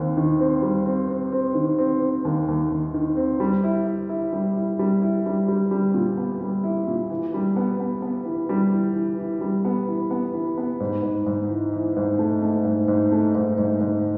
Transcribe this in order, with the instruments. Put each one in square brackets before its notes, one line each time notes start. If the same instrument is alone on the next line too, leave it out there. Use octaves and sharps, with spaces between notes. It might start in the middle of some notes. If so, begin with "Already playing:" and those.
Already playing: [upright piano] D#2 C4
D#3
C4
G3
C4
C4
C4
D#3
C4
C4
D#2
D#2
D#2
D#3
C4
G3
E4
E4
E4
G3
E4
G3
E4
G3
G3
G3
A#2
B3
G3
E4
A#2
E3
G3
B3
B3
B3
E3
G3
E3
E3
E3
G3
B3
E3
B3
E3
B3
G#2
G#2
G#2
E3
E3
G#2
A3
A3
G#2
G#2
A3
G#2
G#2
G#2